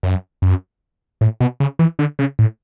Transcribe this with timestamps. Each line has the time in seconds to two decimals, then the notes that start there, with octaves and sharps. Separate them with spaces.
0.03 F#2
0.42 F#2
1.21 A2
1.40 B2
1.60 C#3
1.79 E3
1.99 D3
2.19 C#3
2.39 A2